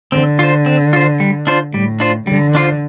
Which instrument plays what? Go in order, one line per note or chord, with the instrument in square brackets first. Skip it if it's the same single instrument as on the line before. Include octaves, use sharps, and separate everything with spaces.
[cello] D3 [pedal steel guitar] C4
[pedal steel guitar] F4 C5
C4
F4 C5
G3
D4 F4 C5
[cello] A2 [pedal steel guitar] G3
[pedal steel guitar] D4 F4 C5
[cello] D3 [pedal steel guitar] G3
[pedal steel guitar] D4 F4 C5